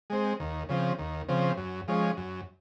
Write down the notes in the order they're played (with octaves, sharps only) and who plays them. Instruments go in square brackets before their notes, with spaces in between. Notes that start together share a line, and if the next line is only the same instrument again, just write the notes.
[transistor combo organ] G#3 C4
D#2
C#3 F3 C4
D#2
C#3 F3 C4
F#2
F3 G#3 C#4
F#2